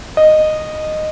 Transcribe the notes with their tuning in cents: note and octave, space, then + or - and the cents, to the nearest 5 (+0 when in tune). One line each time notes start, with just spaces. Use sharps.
D#5 -10